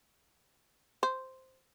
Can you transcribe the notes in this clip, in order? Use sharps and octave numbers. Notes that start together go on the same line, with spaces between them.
C5